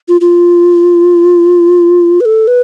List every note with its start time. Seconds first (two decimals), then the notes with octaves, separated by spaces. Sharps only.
0.08 F4
0.21 F4
2.21 B4
2.25 A4
2.47 B4